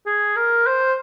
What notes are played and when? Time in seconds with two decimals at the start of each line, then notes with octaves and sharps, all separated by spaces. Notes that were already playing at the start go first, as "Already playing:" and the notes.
0.06 G#4
0.36 A#4
0.66 C5